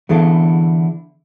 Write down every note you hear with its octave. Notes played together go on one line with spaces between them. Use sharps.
D3 E3 B3 E4 G#4 A4